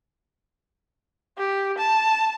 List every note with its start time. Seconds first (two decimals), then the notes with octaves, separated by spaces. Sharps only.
1.38 G4
1.78 A5